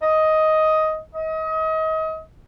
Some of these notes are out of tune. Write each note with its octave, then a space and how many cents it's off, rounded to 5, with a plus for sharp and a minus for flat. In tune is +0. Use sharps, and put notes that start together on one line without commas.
D#5 +10
D#5 +35